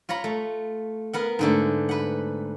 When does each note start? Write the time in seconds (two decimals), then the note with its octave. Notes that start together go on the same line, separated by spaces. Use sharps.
0.09 F4 C#5 A#5 B5
0.24 A3
1.13 B3 A#4 F#5
1.39 G#2 D3 A3
1.89 B4 F#5